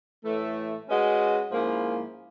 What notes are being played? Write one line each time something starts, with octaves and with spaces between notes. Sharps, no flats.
A2 E3 A3
G#3 C#4 F#4 B4 D#5
G#2 F3 A#3 C#4 E4